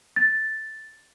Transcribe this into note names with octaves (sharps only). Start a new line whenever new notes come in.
A6